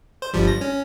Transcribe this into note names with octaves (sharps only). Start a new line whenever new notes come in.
C5
G1 F3 G3
A#6
C#4